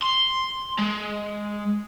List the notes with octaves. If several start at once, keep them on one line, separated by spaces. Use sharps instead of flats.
C6
G#3